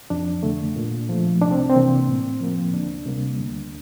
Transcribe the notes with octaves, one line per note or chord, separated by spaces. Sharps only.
F2 D4
D3 A3
A#2
F3 A3
C2 D4
C4
C4
C3 E3 A#3
A2
F3 A#3
D2 D4
C3 G3 A#3
D2